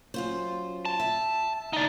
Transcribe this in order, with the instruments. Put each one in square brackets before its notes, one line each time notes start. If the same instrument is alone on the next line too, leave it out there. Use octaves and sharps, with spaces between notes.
[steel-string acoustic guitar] F#2 F4 C5
[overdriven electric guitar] A5
[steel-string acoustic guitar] E5
[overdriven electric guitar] D#4 D5